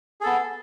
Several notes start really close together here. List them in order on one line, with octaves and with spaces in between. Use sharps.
G#4 A4 B3